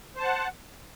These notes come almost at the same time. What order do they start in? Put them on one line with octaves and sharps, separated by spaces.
C5 A5 F#5